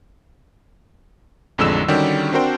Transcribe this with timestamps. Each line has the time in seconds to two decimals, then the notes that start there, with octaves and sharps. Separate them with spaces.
1.58 A1 F2 D3 G#3 E6 E7
1.88 D3 D#3 G3 C#4 F#4 G4
2.32 C4 D4 F#4 A#4 C5 G5